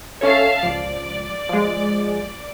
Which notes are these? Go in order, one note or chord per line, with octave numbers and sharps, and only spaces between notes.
C#4 A4 C#5 E5 F5 A5
C#2 F3 D5
F3 G#3